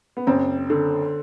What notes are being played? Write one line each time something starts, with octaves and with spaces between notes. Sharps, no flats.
B3
F#1 C4
D3